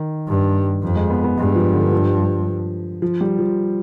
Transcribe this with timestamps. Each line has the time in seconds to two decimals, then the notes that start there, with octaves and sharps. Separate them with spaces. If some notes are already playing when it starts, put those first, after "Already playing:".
Already playing: D#3
0.27 G2
0.82 F2
0.96 G#3
1.10 B3
1.24 B3
1.38 G2 G#3
1.56 F3
1.74 D3
1.92 F3
3.02 F3
3.21 G3
3.39 F3